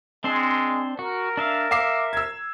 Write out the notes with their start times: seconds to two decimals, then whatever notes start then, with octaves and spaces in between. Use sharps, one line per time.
0.24 G#3 C4 D4 C5
0.99 F#4 A#4
1.37 D4 E5 F5
1.71 E5 F5 D6 C7
2.13 E6 G#6